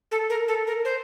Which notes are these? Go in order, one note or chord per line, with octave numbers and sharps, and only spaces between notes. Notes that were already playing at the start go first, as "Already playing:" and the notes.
A4
A#4
A4
A#4
C5